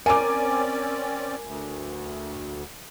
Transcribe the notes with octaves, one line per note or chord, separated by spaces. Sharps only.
C4 C#4 A#4 D5 G#5 D6
D2